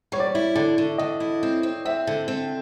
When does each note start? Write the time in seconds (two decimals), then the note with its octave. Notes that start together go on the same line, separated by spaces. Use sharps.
0.12 G3 C#5
0.20 D5
0.27 C#5
0.35 E4
0.56 D3 D5
0.78 D3
0.98 D3 D#5
1.20 E4
1.43 C4
1.63 C4
1.85 C4 E5
2.07 D3
2.28 C4